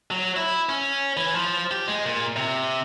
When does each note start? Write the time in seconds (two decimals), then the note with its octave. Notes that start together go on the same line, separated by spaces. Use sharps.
0.11 F#3
0.36 E4
0.69 C#4
1.17 E3
1.35 F3
1.71 G4
1.88 G#3
2.06 A#2
2.36 C3